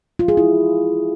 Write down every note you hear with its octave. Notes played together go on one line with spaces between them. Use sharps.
F4
G#4
E4